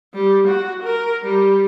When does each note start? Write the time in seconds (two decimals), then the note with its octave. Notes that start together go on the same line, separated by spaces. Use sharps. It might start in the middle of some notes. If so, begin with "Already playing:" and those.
0.14 G3
0.47 F#4
0.83 A#4
1.24 G3